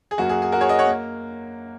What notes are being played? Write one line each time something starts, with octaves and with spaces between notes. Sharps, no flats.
G#4
F#2 F#3 A#3 F#4
G#4
G#4
F#4 A#4
G#4 C#5
A#4 D#5
C#5 F#5
A#3